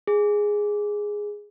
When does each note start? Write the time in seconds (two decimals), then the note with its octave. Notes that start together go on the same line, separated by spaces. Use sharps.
0.07 G#4